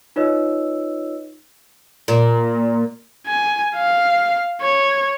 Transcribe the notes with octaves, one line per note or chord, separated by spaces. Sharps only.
D#4 F4 B4 C#5 D#5 E6
A#2
G#5
F5
C#5